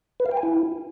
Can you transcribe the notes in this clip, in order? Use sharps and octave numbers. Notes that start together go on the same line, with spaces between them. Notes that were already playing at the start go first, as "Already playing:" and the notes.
B4
F5
G5
G#5
E4